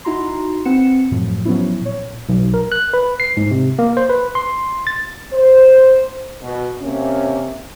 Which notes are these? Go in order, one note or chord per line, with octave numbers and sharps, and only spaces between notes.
D#4 E4 F#4 A#5 C6
C4 B4 F#5 C#7 E7
F#2 A2 F3
F3 F#3 B3 C#4 E4
A#2 C#5
B1
A#4
F#6
B4
C7
G#2
C3
A#3
C5
B4
C6
A6
C5
B2
C3 A#3 C#4